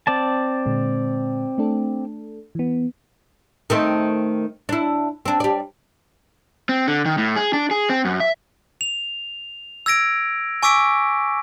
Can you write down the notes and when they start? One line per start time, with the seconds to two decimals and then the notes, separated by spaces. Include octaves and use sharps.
0.07 C4 D5 A5
0.66 A#2 D3 G#3
1.58 A3 D4 A4
2.55 E3 B3
3.70 D#3 A3 C4
4.69 D4 E4
5.26 C4 D4
5.40 G3 D5
6.69 C4
6.87 D3
7.05 D#3
7.18 A2
7.36 G#4
7.54 D4
7.71 G#4
7.89 C4
8.05 F#2
8.20 E5
8.81 F7
9.86 E6 G#6 A#6 D7
10.63 G#5 C#6 D6 E6 B6 D7